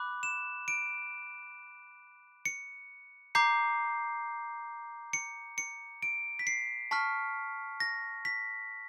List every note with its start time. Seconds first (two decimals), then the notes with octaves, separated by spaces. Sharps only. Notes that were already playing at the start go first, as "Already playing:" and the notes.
Already playing: B5 D6 F#6
0.23 E7
0.68 D7
2.46 C#7
3.35 A#5 D6 G6 C7
5.13 C#7
5.58 C#7
6.03 D7
6.39 B6
6.47 C7
6.91 A5 C#6 F6 B6
7.80 A#6
8.25 B6